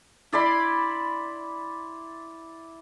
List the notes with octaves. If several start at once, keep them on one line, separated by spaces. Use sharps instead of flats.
E4 D5 B5 C6